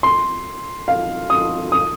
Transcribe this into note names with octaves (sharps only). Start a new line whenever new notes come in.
C6
F5
D#6
D#6